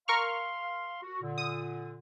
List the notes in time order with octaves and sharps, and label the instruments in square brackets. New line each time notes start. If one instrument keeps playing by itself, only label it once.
[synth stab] A#4 C#6 F6 [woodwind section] F5 C6
[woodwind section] F#4
A#2 D3
[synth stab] D#6